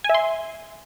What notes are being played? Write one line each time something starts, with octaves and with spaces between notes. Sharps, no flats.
G#5
E5
C6